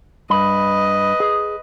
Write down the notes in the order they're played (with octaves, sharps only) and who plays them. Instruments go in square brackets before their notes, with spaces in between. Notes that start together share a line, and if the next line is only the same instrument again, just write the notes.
[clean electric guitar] G2 B5 [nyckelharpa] B4 D#5
[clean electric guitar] G#4